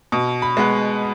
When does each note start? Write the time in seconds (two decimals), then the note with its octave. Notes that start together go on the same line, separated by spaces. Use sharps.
0.12 B2
0.42 B5
0.57 G#3 B3